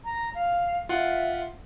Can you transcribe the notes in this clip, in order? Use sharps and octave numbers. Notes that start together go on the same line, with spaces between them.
A#5
F5
F4 E5 F#5